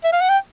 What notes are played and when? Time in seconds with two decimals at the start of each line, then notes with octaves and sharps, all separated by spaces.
0.04 E5
0.12 F5
0.21 F#5
0.29 G5